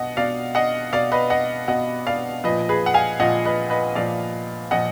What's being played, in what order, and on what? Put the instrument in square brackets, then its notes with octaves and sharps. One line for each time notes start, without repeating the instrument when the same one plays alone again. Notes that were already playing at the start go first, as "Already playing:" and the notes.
Already playing: [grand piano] B2 D#5 F#5
B2 D5 F5
D#5 F#5
B2 D5 F5
B4 D#5
D#5 F#5
B2 D#5 F#5
D5 F5
A#2 F3 B4 D#5
G#4 B4
F#5
F5 G#5
A#2 F3 D#5 F#5
B4 D#5
B4 D#5
A#2 F3 D5 F5
A#2 F3 D#5 F#5